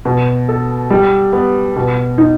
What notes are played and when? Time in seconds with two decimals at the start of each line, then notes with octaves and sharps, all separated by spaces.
0.05 B2
0.49 A4
0.90 G3
1.33 B3
1.76 B2
2.18 D#4